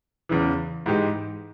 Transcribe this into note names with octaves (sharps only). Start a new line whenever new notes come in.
E2 C#3 E3
G#2 E3 G#3 D#4 G4